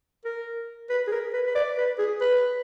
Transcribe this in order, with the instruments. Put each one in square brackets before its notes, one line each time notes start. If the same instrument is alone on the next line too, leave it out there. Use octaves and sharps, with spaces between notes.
[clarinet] A#4
B4
G#4
A#4
B4
B4
D5
B4
G#4
B4